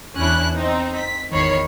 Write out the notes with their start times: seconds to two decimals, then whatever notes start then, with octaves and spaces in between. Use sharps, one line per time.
0.17 E2 C#4 D4 E4 F#6
0.56 C4 D#4
0.96 B6
1.30 G#1 E2 D#3 C#5 B5 C7